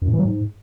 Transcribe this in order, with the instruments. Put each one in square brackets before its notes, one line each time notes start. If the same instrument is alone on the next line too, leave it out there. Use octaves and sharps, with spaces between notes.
[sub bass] F#2
A2
E3
F#3
G#2